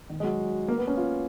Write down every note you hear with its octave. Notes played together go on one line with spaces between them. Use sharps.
D#3
G#3
F#3
A#3
B3
C#4
F4